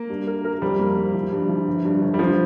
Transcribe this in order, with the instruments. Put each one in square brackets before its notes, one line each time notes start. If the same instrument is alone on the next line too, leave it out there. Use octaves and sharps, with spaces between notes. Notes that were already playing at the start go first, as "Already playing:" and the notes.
Already playing: [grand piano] A#3
[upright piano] G2
A#4
A#4
[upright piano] F2 [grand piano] G3
[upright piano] A#3
A#3
F3
G2
F3
G1
G2
G1
[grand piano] G3
[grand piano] F3 [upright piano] D4